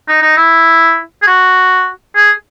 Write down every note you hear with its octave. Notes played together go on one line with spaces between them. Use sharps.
D#4
D#4
E4
G#4
F#4
G#4